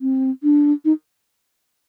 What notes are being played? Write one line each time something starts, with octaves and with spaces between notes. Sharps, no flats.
C4
D4
D#4